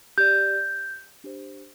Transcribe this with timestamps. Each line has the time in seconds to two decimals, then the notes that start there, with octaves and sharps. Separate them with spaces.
0.18 G4 D5 G6
1.24 D4 G4 C5